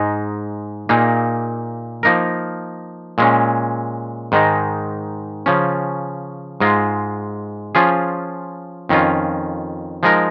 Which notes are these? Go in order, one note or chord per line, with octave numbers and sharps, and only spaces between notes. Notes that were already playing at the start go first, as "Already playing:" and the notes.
Already playing: G#2 G#3 D#4
A#2 A#3 D#4 G#4
F3 A#3 D#4 A#4
A#2 G#3 C#4
G#2 D#3 G#3 D#4
C#3 F3 C#4
G#2 G#3 F4
F3 C#4 F4 G#4
F2 D#3 C#4 F4
F3 G#3 D#4 A#4